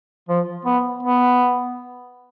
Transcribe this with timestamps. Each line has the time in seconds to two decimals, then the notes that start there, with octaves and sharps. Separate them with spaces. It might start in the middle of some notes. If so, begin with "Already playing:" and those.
0.28 F3
0.65 B3
1.03 B3